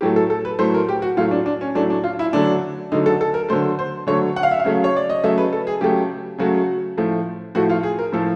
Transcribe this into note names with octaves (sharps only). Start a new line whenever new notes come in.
A2 F#3 A3 G4
A4
A4
B4
A2 F#3 A3 C5
A#4
G4
F#4
A2 F#3 A3 F4
D4
D4
C#4
A2 F#3 A3 D4
D4
F4
E4
D3 F#3 A3 D4
D3 F#3 A3 D#4
A4
A4
A#4
D3 F#3 A3 C5
C5
D3 F#3 A3 C#5
F#5
F5
E5
F5
C#3 F#3 A3
C#5
D5
D#5
C#3 F#3 A3 E5
B4
A4
G#4
C#3 F#3 A3 G4
C#3 F#3 A3 F#4
A2 F3 A3
A2 F3 A3 F#4
F4
G#4
A#4
A2 F3 A3 A4